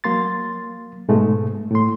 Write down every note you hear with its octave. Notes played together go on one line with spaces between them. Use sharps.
F#3 A#3 C6 A6
G#2 B2 G#3 A3
A2 C6